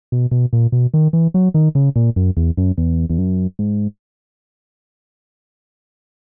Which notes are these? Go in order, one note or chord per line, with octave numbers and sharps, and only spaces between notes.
B2
B2
A#2
B2
D#3
E3
F#3
D#3
C#3
A#2
F#2
E2
F#2
E2
E2
F#2
G#2